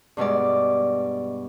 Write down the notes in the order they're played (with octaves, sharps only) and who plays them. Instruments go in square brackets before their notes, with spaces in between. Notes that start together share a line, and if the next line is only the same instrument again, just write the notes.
[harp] G2 B2 G#3 D5